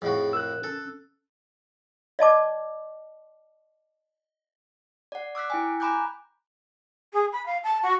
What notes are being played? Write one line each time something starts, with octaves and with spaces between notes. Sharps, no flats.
F2 A2 F#4 G#4
A#4 E6 F#6
C#4 A4
D5 D#5 A5 D6
D5 F#5
D6 E6 F#6 B6
E4 G5 G#5
G#5 A#5 B5 D6 F#6 G6
G#4
B5
F5
A5
F#4